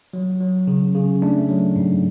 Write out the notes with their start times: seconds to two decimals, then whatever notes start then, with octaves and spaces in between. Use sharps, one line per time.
0.13 F#3
0.40 F#3
0.67 C#3
0.95 C#3
1.22 A3 D4
1.49 F#3
1.76 G#2